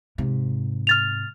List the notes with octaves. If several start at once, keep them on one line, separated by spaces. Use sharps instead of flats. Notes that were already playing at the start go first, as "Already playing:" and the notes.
G#2 C3
F6 A6 F7